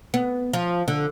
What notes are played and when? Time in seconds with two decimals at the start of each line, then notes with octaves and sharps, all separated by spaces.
0.14 B3
0.53 F3
0.88 D3